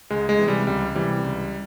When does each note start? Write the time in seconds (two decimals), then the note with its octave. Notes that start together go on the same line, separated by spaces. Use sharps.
0.10 C#2 G#3
0.29 G#3
0.39 C3 E3
0.48 G3
0.67 C#2 G3
0.95 C3 E3 G3
1.24 C#2